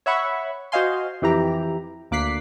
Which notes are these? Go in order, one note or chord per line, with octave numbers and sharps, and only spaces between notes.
C#5 E5 F#5 B5 C#6
F#4 C5 D#5 F5 G#5 C6
F2 E3 G4 A#5
D2 A#3 D6 F#6 B6 C7